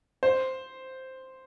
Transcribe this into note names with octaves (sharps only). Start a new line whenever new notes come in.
C5